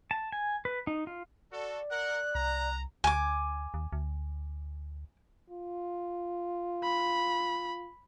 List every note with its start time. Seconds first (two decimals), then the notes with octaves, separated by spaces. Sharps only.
0.11 A5
0.32 G#5
0.65 B4
0.87 D#4
1.07 F4
1.52 F#4 A4 D5
1.91 A#4 F#5 F#6
2.35 C2 A#5
3.04 D2 G#5 D6
3.74 D#2
3.93 D2
5.50 F4
6.83 B5